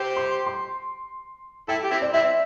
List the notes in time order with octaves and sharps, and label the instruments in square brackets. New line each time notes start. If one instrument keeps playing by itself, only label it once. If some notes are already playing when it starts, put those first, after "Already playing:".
Already playing: [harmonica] G4 C5
[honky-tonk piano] C6
C6
[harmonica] E4 A4 [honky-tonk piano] G5
[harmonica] G4
C4 E4
[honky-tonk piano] D5
[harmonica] C4 E4 [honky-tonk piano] E5